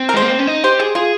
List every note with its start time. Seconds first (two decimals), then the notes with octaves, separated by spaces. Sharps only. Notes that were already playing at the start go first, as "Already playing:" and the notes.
Already playing: C4
0.09 A#4
0.14 G#3 C5
0.22 A#3
0.30 C4
0.39 C#4
0.47 D#4
0.64 G4 C5
0.79 G4 G#4
0.95 F4 G#4